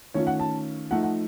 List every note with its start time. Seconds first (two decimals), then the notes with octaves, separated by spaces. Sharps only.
0.14 D#3 A3 C#4 F4 C#5
0.27 F#5
0.40 A5
0.91 F3 A3 D#4 F#5
1.03 F#5